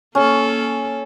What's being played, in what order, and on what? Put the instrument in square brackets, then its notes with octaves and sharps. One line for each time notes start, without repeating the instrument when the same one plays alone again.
[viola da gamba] A#3 A4 [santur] C#4